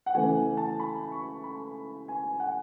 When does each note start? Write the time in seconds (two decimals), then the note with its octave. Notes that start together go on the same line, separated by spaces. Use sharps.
0.06 F#5
0.15 C#3 E3 A3 G#5
0.57 A5
0.80 B5
1.12 C#6
1.44 B5
2.08 G#5
2.40 F#5